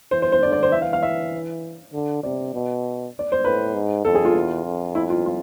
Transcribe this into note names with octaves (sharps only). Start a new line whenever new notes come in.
E3 C5
C5
C5
D3 D5
D5
C5
E3 E5
F5
F5
E5
D3
C3 D5
B2
D5
C5
A2 B4
G#2
F2 A4
G#4
F4
E2
F2
E4
F4
F4